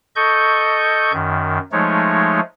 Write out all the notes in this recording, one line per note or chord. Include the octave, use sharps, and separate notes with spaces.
A4 D#5 C#6 G6
F#2 D#3
F3 G#3 A3 D#4 C#5